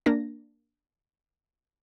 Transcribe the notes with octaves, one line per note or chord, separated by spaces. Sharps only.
A#3 D4 A#6